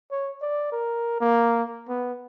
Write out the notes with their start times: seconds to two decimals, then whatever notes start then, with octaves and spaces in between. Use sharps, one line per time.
0.11 C#5
0.42 D5
0.72 A#4
1.21 A#3
1.89 B3